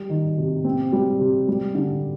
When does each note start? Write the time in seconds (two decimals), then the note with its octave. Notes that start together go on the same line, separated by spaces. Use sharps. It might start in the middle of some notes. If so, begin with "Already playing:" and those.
Already playing: G3
0.10 D#3
0.38 C3
0.64 C4
0.93 G3
1.19 C3
1.48 G3
1.75 D3